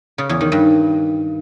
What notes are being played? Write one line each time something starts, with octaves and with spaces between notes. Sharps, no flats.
C#3
E2
D#3
G2